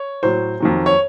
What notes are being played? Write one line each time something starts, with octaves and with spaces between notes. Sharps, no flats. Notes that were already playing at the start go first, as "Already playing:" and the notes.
Already playing: C#5
A2 F#3 C5
F2 D#3 F#3
C#5